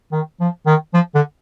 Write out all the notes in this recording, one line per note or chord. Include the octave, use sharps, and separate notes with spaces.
D#3
F3
D#3
F3
D3